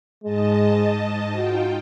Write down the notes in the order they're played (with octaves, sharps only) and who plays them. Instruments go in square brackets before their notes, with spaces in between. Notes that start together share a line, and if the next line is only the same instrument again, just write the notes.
[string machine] G#2 D#5 A5 [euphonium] G#3
[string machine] D#4 F4 G5 [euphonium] F#4